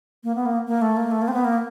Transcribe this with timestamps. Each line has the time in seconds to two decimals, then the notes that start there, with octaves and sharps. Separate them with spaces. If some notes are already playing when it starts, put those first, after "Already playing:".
0.24 A#3
0.35 B3
0.45 A#3
0.67 A#3
0.82 A3
0.97 A#3
1.11 A3
1.22 A#3
1.28 C4
1.33 B3
1.44 A#3